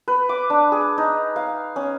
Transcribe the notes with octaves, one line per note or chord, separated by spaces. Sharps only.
B4
D6
D4
G#4
D#4
F5
C#4